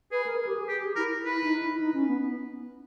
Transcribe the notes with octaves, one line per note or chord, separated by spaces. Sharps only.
G#4 B4
A#4
A#4
G4
G#4
G4 G#4
G4
E4 A#4
E4 B4
D#4
E4
D#4
C#4
B3